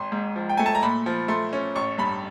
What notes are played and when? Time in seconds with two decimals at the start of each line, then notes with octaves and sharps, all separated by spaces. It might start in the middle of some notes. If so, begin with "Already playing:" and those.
Already playing: G#1 C6
0.12 G#2
0.36 F3
0.49 G5
0.57 A3 G#5
0.66 A5
0.75 A#5
0.83 A#2 B5
1.06 F3
1.28 A3 C6
1.53 C#4
1.75 A1 C#6
1.98 G2 B5